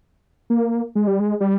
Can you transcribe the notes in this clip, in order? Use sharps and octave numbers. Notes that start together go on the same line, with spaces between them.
A#3
G#3
G3
G#3
G3